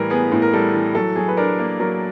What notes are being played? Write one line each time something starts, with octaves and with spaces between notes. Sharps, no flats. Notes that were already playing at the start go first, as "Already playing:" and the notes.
Already playing: A2 E3 G3 A#4 B4
B3 G#4
A2
A#4
G3 A4
E3
F#3 A4
F#3 G#4
B4
D4 A#4
A#3
F#3 A#4